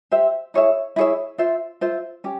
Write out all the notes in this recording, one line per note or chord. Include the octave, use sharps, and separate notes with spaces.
G4 C5 E5
E4 G#4 C#5 E5
E4 G#4 C#5 E5
F4 C5 E5
F4 C5 E5
C#4 G4